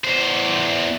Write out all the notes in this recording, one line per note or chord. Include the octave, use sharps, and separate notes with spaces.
E2 C5